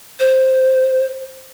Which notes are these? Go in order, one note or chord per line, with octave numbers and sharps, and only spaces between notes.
C5